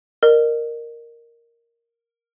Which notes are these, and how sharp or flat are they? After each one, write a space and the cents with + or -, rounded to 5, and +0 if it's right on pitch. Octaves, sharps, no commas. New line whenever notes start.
A#4 +0 D#5 -35